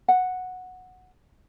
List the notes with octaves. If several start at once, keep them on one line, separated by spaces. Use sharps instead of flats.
F#5